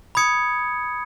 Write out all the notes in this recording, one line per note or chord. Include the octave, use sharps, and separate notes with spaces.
B5 D#6 G#6 C#7